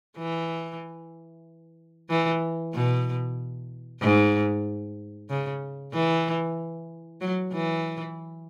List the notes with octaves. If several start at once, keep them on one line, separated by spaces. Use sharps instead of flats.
E3
E3
B2
G#2
C#3
E3
F#3
E3